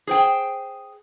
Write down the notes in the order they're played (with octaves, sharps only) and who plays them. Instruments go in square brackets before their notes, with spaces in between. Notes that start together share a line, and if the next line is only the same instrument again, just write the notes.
[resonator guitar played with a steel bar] G#4 C5 G5